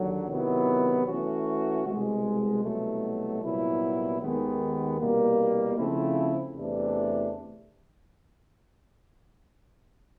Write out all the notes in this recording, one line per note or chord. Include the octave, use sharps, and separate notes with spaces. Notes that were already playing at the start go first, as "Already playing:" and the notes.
Already playing: D#2 D3 F#3
C3 D#3 F#3 B3 E4
E3 A3 C#4 F#4
C2 B2 G#3
C2 B2 F#3 A3
C2 A#2 F#3 B3 E4
D#2 D#3 G#3 B3
C2 B2 G3 A#3
C#3 F3 A3 C4 E4
E2 C3 E3 A3 D4